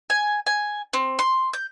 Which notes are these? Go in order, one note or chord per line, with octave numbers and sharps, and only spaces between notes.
G#5
G#5
C4
C6
G6